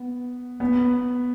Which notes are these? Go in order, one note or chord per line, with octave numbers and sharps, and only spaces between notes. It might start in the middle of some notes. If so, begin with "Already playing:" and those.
Already playing: B3
B3